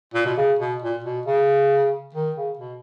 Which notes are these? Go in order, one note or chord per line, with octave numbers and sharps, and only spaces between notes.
A#2
B2
C#3
B2
A#2
B2
C#3
D#3
C#3
B2